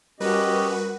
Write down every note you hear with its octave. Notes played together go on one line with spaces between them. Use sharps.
G3 C#4 F#4 G4 A#4 B4 D#5 F#6